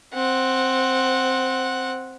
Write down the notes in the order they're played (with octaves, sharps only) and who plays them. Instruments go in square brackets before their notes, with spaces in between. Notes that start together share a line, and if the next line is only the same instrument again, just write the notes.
[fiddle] C4 F#5